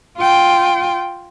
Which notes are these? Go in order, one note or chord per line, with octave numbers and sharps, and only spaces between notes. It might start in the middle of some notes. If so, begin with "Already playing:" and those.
F4 G5